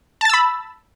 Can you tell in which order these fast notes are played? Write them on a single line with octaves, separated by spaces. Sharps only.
A5 A6 E6 B5